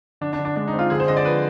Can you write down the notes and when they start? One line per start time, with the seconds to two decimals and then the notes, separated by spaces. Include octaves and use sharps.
0.21 D3 D4
0.33 D4
0.39 D3
0.45 D4
0.56 G#3 D4
0.67 D#4
0.73 C4
0.79 F4
0.90 D3 G#4
1.00 C5
1.08 D3 D#5
1.17 D5
1.25 F3 B4